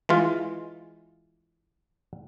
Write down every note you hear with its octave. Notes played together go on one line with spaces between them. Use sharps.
E3 G#3 F4